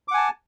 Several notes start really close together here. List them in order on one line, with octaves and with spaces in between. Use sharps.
D6 F#5 G#5 A5